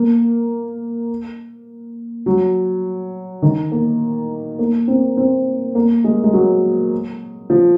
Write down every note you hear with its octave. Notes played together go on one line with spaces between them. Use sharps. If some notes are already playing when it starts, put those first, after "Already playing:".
Already playing: A#3
F#3
D#3
A#3
A#3
C4
C4
A#3
G#3
G#3
F#3
F3